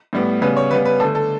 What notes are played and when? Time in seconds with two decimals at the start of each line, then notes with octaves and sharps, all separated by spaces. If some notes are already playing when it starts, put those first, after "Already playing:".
0.13 A2 G3 B3
0.42 C#3 G3 B3 B4
0.57 C#5
0.71 C#3 G3 B3 B4
0.85 B4
1.00 D3 A3 A4
1.15 A4